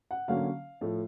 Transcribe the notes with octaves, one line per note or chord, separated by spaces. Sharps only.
F#5
D3 F#3 A#3 C#4 F5
A2 F3 A3